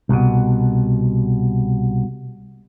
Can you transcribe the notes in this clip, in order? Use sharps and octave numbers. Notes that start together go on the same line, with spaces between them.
C2 B2